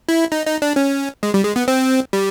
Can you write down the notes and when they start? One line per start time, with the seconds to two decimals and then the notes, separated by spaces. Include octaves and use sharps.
0.09 E4
0.32 D#4
0.46 D#4
0.62 D4
0.76 C#4
1.23 G#3
1.34 G3
1.44 G#3
1.56 B3
1.68 C4
2.13 G3